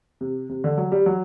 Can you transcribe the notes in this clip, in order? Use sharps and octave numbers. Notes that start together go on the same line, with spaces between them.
C3
C3
D3
F#3
G3
F#3